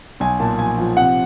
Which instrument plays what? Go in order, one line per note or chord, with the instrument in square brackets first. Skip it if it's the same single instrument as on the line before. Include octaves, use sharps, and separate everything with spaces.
[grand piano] B1 G#5
A#2 A5
F3 G#5
F3
C3 F#5